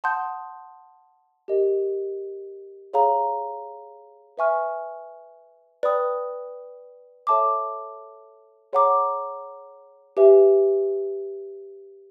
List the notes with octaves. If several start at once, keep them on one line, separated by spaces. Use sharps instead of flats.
F#5 A5 C6 D#6 G6
G4 A#4 D#5
G#4 C#5 F5 A#5
B4 E5 G#5 C#6 F6
B4 D5 G5 B5 D#6
A4 C#5 E5 A5 D6
G#4 C#5 F#5 A#5 D6
G4 B4 E5 G#5